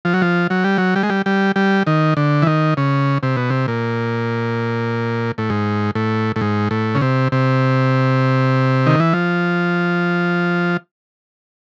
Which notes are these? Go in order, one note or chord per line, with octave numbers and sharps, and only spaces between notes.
F3
F#3
F3
F#3
G3
F#3
G3
G#3
G3
G3
G3
D#3
D3
E3
D#3
C#3
C3
B2
C3
A#2
A2
G#2
A2
A2
G#2
A2
C#3
C3
C3
D#3
E3
F3